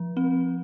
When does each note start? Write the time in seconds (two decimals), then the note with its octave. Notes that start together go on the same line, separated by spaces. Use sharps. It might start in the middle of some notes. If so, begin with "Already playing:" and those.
Already playing: F3
0.17 C4